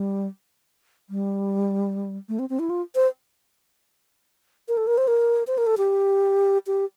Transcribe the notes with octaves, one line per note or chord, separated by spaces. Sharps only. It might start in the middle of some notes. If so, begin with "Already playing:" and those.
Already playing: G3
G3
A3
C4
C4
E4
F4
C5
A#4
A4
A#4
C5
A#4
C5
A#4
A4
G4
G4